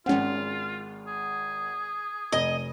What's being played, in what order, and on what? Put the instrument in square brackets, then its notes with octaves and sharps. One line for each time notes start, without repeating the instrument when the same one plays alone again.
[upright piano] G#1 G#3 F#5 [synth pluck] C4 C#4 [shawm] F4
[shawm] G#4
[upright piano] F1 [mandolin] D#5